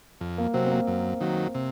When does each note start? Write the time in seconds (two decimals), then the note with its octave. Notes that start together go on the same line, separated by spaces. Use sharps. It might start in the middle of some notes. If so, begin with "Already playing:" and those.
0.21 F2
0.38 A#3
0.54 C3 F#3 C4
0.66 C4
0.71 A#3
0.87 F#2
1.20 D#3 F#3
1.55 C3